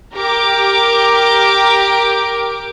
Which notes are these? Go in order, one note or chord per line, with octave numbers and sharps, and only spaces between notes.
G4 A#4 D6